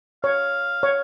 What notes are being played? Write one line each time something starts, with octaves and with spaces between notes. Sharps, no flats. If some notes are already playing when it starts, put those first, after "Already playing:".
C#5 F5
C#5